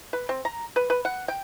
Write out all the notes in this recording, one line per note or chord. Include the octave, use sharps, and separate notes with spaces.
B4
C4
A#5
B4
B4
F#5
G5